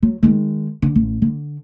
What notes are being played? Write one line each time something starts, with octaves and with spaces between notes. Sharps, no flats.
F#3
D#3 G#3
D3
A1
D3